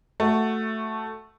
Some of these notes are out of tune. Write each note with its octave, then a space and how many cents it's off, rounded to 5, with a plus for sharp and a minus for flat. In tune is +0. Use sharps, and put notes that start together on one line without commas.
A3 +0 F#4 +0